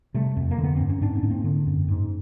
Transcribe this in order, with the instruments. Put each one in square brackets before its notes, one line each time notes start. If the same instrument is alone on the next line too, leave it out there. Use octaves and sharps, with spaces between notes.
[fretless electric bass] C3 G3 A3
F2
A#3
D3
B3
G2 C4
C#4
G#2 C4 D4
B3 C#4
G#2
A#3 C4
D3
F#2
G#2